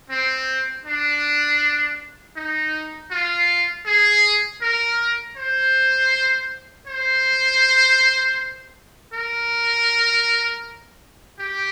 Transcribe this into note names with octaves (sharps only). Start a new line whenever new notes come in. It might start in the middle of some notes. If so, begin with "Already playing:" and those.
C4
D4
D#4
F4
G#4
A#4
C5
C5
A#4
G4